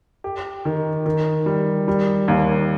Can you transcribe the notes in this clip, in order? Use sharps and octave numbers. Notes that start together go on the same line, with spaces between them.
G4
D#3
D#3
G3
G3
D#2